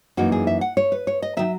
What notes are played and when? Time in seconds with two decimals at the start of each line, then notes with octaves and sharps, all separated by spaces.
0.17 F#2 E3 A#3 D#4 F#4
0.32 G#4
0.47 E5
0.61 F#5
0.77 C#5
0.92 B4
1.07 C#5
1.22 D#5
1.37 D#3 F#3 E5